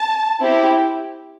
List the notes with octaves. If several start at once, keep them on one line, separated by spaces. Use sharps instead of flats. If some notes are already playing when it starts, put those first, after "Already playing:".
Already playing: A5
C4 E4 G4